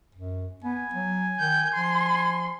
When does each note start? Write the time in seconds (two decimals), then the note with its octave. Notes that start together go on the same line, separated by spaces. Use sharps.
0.15 F#2
0.64 B3 G#5
0.94 F#3
1.39 D#3 G6
1.74 F3 C6